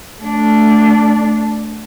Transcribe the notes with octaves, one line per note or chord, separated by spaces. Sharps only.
A3 D4